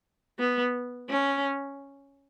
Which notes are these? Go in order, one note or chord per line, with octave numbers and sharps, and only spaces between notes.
B3
C#4